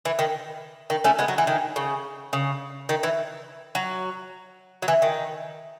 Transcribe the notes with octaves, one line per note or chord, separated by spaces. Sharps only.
E3
D#3
D#3
A3 C#4
G#3 B3
F#3
E3
D#3
C#3
C#3
D#3
E3
F#3
F#3
E3
D#3